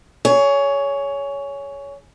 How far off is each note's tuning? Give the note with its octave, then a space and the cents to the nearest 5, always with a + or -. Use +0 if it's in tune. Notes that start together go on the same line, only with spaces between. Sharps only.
G#4 +5 C#5 +20